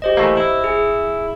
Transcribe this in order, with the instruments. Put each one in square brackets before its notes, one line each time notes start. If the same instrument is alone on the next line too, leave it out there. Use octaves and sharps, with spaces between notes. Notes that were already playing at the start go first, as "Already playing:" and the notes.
[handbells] G4 C5 D#5
[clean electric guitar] E3 A3 A#3
E4
[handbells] G#4